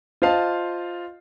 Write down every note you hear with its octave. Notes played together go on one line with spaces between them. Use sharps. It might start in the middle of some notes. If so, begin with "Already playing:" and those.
F4 C5 D#5 F5 A5